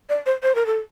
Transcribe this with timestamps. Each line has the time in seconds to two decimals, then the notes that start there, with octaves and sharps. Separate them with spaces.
0.09 D5
0.26 C5
0.43 C5
0.55 A#4
0.66 A4